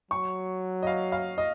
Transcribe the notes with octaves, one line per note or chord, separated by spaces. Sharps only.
F#3 C#6
D#5
F5
F5
D#5